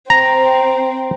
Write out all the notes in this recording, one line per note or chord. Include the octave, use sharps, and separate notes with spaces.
C4 A#5